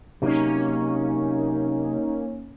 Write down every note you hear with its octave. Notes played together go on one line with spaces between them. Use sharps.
C3 F#3 A#3 C#4 D#4